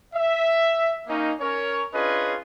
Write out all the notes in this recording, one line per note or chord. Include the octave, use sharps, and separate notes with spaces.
E5
A#3 C#4 D#4
C#4 A#4 C#5
C#4 D4 F4 G#4 B4 D#5